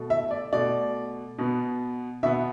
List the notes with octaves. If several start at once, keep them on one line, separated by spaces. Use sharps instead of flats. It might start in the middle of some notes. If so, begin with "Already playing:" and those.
Already playing: B2 A3
E5
D5
B2 A3 D5
B2 B3
B2 B3 E5